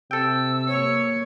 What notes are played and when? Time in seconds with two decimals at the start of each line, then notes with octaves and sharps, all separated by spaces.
0.11 C3 A4 G5 E6
0.68 A#3 C#5